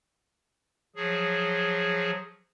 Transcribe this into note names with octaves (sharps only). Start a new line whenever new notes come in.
F3 F#3 G#4